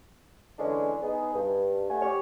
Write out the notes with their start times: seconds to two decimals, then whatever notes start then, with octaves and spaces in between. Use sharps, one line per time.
0.59 D3 E3 G#3 C#4 D4
1.02 B3 D#4 G#4
1.34 G2
1.89 A3 F#5 G#5
2.02 G4 C#5